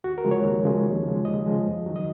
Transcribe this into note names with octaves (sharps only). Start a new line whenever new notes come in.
D#2 F#4
A#4
C#3 F3 G#3
C#5
D#2
C#3 F3 G#3
D#2
C#3 F3 G#3
D#2 D#5
C#3 F3 G#3
F2
D#3 F#3
D#5